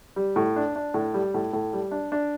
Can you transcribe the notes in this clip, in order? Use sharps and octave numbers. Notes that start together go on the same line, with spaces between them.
G3
A2
D4
D4
A2
G3
A2
A2
G3
D4
D4